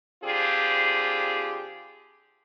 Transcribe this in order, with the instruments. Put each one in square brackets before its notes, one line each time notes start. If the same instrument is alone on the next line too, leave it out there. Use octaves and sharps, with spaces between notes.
[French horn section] D3 C4 F4 G4 G#4